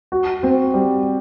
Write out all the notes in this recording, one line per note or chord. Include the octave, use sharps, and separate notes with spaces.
F#4
C4
G3